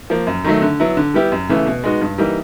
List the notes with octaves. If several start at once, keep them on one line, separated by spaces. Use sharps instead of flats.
F3 A#3
F#2
D#3 F#3 A3
D3
F#3 B3 E4
D3
G3 B3 E4 G4
F#2
C#3 E3 A3
B2
G#3 B3 D#4 F#4
G2
E3 G3 A#3 D#4